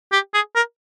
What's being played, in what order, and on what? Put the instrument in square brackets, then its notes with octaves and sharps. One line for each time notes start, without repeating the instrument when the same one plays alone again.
[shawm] G4
G#4
A#4